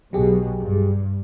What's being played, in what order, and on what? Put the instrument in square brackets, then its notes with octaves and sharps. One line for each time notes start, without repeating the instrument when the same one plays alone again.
[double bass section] B1 B2 [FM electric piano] F#3 G4 G#4
[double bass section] G2